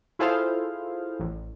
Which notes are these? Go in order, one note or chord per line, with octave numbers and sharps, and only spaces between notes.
E4 F4 G#4 A4 C5 F5
A1